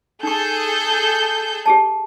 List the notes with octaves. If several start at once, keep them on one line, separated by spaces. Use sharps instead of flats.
D#4 G#4 A4 C#6 G6
G4 G#4 A5